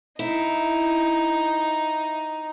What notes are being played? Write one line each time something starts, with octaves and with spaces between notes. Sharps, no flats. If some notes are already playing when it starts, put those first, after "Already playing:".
D#4 E4